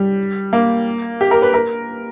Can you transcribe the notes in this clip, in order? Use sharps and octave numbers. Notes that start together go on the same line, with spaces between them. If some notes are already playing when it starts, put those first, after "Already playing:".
Already playing: G3
A#3
G4
A#4
B4
A#4